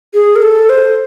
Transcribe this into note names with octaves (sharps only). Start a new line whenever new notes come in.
G#4
A#4
A4
C5